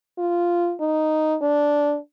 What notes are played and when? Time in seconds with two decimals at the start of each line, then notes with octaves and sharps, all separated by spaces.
0.18 F4
0.81 D#4
1.42 D4